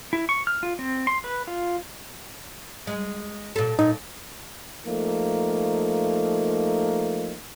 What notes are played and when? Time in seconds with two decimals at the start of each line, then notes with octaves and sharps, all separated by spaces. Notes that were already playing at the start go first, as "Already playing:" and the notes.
0.13 E4
0.29 C#6
0.47 F6
0.63 F4
0.79 C4
1.07 C6
1.24 B4
1.47 F4
2.87 G#3
3.56 A#2 A4
3.79 A#2 D#4
4.86 F3 A3 A#3 D#4